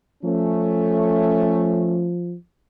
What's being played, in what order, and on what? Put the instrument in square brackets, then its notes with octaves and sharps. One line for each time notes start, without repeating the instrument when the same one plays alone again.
[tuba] F3 [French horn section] A3 C#4